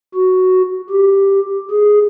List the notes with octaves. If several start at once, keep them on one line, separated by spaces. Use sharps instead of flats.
F#4
G4
G#4